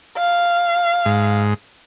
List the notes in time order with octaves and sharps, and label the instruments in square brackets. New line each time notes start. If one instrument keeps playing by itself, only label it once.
[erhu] F5
[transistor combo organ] G#2